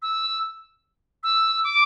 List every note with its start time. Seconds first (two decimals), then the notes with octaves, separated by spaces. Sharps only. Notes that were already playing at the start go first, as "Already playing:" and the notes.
0.02 E6
1.23 E6
1.64 D6